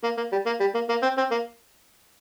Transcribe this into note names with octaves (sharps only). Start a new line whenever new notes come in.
A#3
A#3
G3
A#3
G3
A#3
A#3
C4
C4
A#3